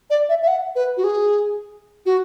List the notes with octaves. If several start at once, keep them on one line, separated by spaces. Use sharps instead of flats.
D5
E5
E5
F#5
B4
F#4
G#4
F#4